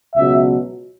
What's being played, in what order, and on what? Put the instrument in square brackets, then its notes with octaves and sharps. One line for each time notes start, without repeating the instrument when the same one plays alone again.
[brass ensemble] C#2 B2 F#3 E5